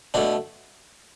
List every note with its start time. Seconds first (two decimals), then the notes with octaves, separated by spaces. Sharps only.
0.14 B2 A3 D4